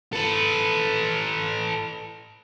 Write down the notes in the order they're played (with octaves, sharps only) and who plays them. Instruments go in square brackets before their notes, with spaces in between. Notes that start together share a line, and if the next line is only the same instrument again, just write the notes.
[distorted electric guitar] A4 B4